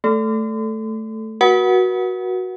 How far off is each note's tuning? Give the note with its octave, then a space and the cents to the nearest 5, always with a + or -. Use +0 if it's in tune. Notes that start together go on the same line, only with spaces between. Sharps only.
A3 +0 A4 +0
F#4 +0 B4 -45 F#5 +0